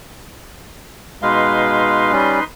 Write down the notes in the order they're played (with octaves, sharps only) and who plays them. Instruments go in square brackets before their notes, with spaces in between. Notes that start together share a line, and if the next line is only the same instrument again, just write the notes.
[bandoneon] B2 G#3 F5 [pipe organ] D#4 B4 C6
[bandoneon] G3 C#4